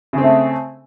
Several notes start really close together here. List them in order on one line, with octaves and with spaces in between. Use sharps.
C#3 C4 A3